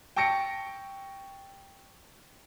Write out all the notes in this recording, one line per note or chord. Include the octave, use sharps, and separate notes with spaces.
G5 A5 C#6 A#6 C#7 D7